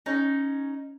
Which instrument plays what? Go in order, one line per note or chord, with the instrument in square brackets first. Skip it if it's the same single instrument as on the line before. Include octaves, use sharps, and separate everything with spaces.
[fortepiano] C#4 [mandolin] D#4